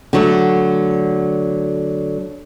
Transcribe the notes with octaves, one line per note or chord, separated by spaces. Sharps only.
D3 F#3 A3